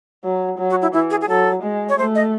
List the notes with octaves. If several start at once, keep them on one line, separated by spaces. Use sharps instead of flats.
F#3
F#3
F#4
E4
E3 E4
G#4
G#4
F#3 A4
G#3
C#5
A3 C5
D#5